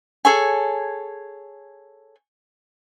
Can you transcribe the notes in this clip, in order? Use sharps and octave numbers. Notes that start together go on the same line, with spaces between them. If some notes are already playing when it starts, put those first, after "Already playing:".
G#4 A4 C#5 G#5